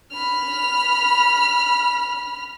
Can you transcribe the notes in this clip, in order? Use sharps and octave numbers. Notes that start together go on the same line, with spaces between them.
B5 F6